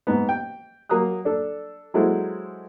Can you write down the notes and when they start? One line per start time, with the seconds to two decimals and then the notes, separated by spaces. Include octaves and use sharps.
0.07 G#2 B3
0.29 G5
0.89 F#3 A#3 A#5 D#6 F#6
1.25 D4 A4
1.94 F#3 G#3 E4 F#4 A4 C5